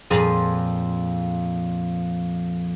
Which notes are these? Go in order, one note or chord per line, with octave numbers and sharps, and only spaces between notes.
F2 A#2 G#4